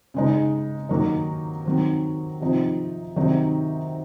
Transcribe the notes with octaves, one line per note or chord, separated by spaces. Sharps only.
C#3 G#3 D#4
D#3 F#3 A#3 D#4
D#3 F#3 C4
C3 F3 C4 D#4
C3 D#3 F#3 C4 D#4